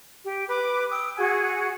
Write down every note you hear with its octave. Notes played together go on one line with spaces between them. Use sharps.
G4
B4 D6
G5 D#6 E6
F#4 G#4 F#5 G#5